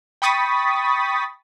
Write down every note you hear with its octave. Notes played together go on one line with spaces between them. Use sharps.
G5 B5 C#6 D#6 A6 B6